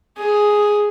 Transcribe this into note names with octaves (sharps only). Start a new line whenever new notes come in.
G#4